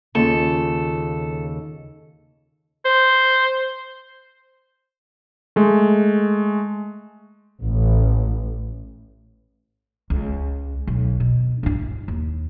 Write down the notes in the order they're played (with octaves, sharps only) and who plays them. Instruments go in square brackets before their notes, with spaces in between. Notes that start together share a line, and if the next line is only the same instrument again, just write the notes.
[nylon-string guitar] D#2 C#3 F4 [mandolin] A4
[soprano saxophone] C5
[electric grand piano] G#3 A3
[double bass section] A1
[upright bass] C#2
B1 F#3
B2
G2 E4
D#2